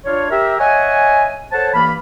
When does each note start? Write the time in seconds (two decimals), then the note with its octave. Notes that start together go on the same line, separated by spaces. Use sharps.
0.05 D4 F4 C#5
0.30 G4 A#4 E5
0.59 C#5 D#5 E5 F#5 G#5
1.52 A4 C5 C#5 F#5 A5
1.74 G2 E3 A#3 F5 B5